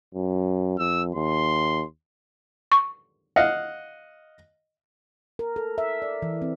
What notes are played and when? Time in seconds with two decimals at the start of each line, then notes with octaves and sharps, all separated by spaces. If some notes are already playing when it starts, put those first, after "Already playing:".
0.14 F#2
0.79 F2 E6
1.15 D#2 C6
2.72 C#6
3.36 D#5 F5 F#5
5.39 A#4
5.56 A4
5.78 E5
6.02 D5
6.22 E3
6.42 C4